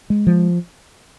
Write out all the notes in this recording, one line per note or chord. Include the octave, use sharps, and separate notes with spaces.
G#3
F3